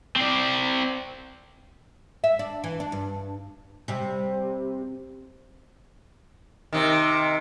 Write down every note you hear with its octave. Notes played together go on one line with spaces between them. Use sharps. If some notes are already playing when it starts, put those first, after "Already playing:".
C4 D5
E5
D4
E3
D4
G2
C3 G3
C3 D#3